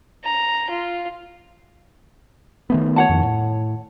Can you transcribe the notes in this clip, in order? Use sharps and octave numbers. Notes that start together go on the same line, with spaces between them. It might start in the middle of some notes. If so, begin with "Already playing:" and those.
A#5
F4
D#3 A3 B3
C#5 F#5 A5
F2 D#3
A2